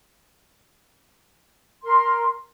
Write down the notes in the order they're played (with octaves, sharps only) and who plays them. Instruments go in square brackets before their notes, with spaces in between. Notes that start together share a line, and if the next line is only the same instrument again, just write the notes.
[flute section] A#4 C6